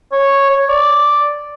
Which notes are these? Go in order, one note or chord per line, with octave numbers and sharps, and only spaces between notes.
C#5
C#5
D5